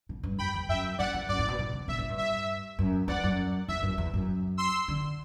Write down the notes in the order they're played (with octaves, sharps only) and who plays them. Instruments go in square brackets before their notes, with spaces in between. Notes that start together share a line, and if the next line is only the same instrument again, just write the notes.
[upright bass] B2
G2
[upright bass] F#2 [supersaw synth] G5 B5
[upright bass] E2
[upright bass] F#2 [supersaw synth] E5 G5
[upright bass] F#2 [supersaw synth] D5 F#5
[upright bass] E2
[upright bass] F#2 [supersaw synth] D5
[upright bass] A2
B2
B2
C3
[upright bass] B2 [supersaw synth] E5
[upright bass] A2
G2
[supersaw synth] E5
[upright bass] F#2
[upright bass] E2 [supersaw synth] D5 F#5
[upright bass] F#2
[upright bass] E2 [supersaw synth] E5
[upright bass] F#2
E2
F#2
[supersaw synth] C6 E6
[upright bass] D3